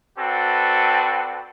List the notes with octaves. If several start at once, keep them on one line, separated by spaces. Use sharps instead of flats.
C4 F#4 A4 B4 D5 A5